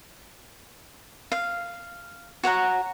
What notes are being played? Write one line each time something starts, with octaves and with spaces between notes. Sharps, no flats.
F5
F#4 C#5 F#5 A#5